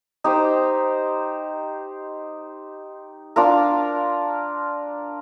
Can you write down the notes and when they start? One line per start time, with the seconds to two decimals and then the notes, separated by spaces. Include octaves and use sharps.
0.24 D#4 G4 C5
3.36 D4 F4 A#4